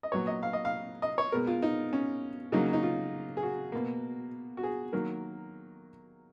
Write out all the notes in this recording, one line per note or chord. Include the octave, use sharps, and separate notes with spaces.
D#5
A#2 F#3 B3 C#5
D#5
F5
D#5
F5
D#5
C#5
B2 G#3 B3 A#4
F4
D#4
C#4
C#3 F#3 A#3 D#4
D#4
F4
G#4
F#4
B2 A#3
F#4
G#4
D#3 F#3 A#3 A#4